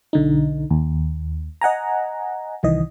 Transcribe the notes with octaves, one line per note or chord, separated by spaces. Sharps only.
B1 D3 D#4
D#2
D#5 F#5 G#5 A#5
C2 D#3 E3 D#5